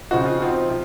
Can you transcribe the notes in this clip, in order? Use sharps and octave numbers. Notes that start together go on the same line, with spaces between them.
C#3 F3 C4 D#4 F#4
F4
F3 C4 D#4
C3 F3